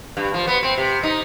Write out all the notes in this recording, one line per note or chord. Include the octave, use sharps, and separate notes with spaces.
G2
F3
B3
C4
C3
D#4